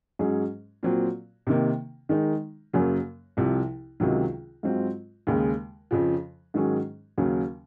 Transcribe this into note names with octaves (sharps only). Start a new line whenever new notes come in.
G#2 F#3 C#4 G#4
A#2 F#3 C4
C3 D#3 A#3
D#3 G#3 D#4
F#2 C#3 F#3 A#3
C2 C3 F3
C#2 C3 D#3 F#3
G#2 F#3 C4 F4
D#2 C#3 G#3
F2 C#3 F3
G#2 D#3 F#3 C#4 G#4
D#2 C#3 F#3 C#4